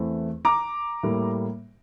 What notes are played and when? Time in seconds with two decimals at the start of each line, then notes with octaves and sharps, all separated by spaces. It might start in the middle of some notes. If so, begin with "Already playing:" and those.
Already playing: E2 E3 A3 C4
0.45 A#5 D6
1.03 A2 G3 A#3